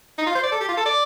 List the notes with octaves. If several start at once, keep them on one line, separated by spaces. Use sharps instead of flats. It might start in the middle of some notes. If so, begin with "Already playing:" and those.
D#4
F4
C5
D5
A4
G4
F4
A4
D5